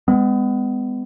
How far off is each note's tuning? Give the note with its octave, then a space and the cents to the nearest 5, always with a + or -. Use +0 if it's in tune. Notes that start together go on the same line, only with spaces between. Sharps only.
G#3 -25 B3 +30